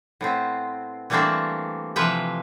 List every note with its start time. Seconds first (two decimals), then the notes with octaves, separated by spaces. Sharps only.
0.21 A2 B3 C4
1.10 E3 G3 A3 A#3 C4 D4
1.96 C3 E3 F3 B4 E5 G5